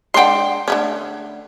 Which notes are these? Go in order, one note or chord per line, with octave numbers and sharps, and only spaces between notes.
G#3 D4 F#5 G5 C6
D3 A3 C#4